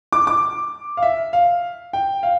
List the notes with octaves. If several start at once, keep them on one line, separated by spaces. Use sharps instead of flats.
D6
D6
F5
E5
F5
G5
F5